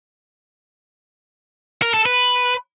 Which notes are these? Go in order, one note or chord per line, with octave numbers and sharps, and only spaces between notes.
A#4
A4
B4